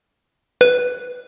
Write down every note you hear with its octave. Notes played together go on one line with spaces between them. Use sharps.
B4